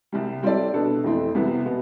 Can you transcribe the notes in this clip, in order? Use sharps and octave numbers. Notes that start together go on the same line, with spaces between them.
C2 C3 G3
G3 C4 E4 A4 D5
B2 B3 D4 A4
F2 E3 A3 C4 E4
C2 C3 E3 B3
B2 B3